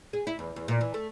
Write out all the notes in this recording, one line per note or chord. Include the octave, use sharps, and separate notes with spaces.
G#4
E4
E2
E2
A#2
E3
A3